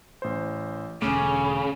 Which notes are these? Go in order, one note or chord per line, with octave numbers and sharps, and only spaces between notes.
A1 C5
E1 D2 C#3 A3 C#4 D6